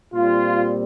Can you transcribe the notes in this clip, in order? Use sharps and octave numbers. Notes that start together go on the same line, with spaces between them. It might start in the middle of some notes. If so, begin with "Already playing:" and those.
A#2 G3 C4 F4